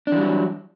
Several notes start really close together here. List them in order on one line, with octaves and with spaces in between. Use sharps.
D4 E3 G3 F#3